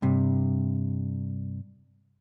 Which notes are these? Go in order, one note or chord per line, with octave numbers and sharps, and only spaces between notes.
G2 C3